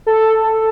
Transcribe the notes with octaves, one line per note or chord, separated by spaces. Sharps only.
A4